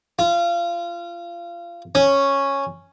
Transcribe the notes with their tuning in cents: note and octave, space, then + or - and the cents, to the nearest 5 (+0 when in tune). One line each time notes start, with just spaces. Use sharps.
F4 -25
C#4 -5